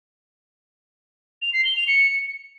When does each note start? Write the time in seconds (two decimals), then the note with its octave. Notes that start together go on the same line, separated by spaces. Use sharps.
1.42 F7
1.53 C7
1.65 G7
1.76 F7
1.88 C#7